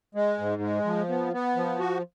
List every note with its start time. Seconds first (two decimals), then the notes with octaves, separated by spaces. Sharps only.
0.15 G#3
0.38 G#2
0.62 G#3
0.85 F3
1.09 B3
1.33 B3
1.56 F3
1.79 F#4